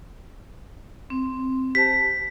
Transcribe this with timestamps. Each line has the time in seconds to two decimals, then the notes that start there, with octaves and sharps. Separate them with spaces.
1.10 C4
1.75 G4 C5 A5 B6